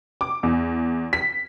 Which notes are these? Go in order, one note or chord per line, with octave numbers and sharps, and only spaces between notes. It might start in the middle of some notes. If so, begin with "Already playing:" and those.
D6
E2
B6